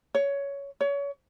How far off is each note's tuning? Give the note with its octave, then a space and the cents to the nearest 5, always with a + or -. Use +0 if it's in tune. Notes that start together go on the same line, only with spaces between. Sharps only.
C#5 +15
C#5 +30